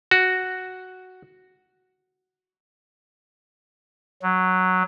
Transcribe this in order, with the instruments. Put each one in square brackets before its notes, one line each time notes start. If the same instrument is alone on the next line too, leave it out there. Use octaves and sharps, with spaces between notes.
[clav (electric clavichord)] F#4
[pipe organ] F#3